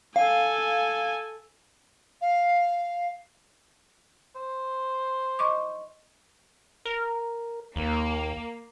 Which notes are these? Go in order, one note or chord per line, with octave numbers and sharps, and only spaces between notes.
A4 F5 G#5
F5
C5
D#5 C#6 D6
A#4
D#2 A#3